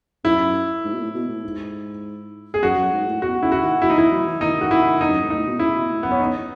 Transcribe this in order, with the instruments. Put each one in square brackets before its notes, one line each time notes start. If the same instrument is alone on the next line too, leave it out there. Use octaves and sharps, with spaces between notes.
[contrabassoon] F#2 [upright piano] E4
[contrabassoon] G#2
B2
A2
B2
A2
G#2
[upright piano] G#4
[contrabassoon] F#2 [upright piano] F#4
[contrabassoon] F#2
G#2
A2
[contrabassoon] B2 [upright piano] F#4
[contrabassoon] C#3 [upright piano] E4
[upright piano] F#4
[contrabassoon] D#3
[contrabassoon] F#3 [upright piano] E4
[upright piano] D#4
[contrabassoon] E3 [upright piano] E4
[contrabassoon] F#3
E3
[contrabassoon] D#3 [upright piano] D#4
[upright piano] F#4
E4
D#4
[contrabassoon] F#2
G#2
[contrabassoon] A2 [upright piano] D#4
[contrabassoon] B2
[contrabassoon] C#3 [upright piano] E4
[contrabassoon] B2
A2
[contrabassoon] F#2 [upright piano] B3
[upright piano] C#4
[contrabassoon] E2 [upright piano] D#4